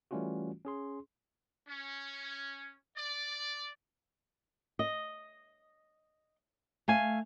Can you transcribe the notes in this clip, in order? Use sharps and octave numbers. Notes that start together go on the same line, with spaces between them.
E3 G3 A3 C#4 F4 F#4
C#4 G#4 C6
C#4
D5
D#5
A3 F5 G#5